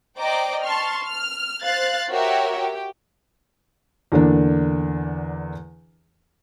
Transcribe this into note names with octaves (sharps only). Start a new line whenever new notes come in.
C5 D5 D#5 G5 A#5 D6
A5 C6 C#6 F6
F6
C5 F5 F#6 A6
F#4 G4 A#4 C#5 E5
G4
E2 D3 A#3 D4